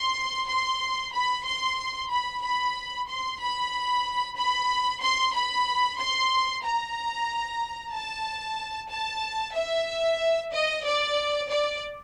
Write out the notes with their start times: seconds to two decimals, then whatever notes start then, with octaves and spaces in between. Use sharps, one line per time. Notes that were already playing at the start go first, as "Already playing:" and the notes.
Already playing: C6
0.49 C6
1.14 B5
1.46 C6
2.12 B5
2.43 B5
3.09 C6
3.41 B5
4.38 B5
5.02 C6
5.35 B5
5.99 C6
6.64 A#5
7.93 A5
8.91 A5
9.55 E5
10.53 D#5
10.85 D5
11.50 D5